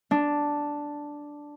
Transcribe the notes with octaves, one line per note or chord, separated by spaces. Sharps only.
D4